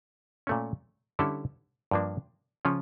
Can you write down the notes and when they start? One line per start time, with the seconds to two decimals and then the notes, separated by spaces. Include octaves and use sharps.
0.47 A#2 A3 C#4
1.19 D3 G3 C#4 E4 A4
1.91 G2 F3 A#3 D4
2.65 C#3 F3 C#4 F4